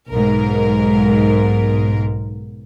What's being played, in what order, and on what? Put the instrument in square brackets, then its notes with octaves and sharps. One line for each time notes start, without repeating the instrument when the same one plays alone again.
[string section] B1 G#2 A#4